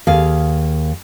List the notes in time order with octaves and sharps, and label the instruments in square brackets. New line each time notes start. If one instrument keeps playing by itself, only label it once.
[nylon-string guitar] D#2 G#4 F5